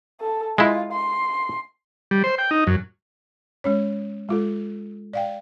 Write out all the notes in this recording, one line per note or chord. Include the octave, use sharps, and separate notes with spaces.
A4
G#3 E4 F4
C6
G3
C5
G5
D#4
F#2
G#3 C#4 C#5
G#3 F4 A4
D5 F5 G5